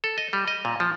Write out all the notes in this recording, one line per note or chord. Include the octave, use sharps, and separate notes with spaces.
A4
D#5
G3
D#5
A#2
F3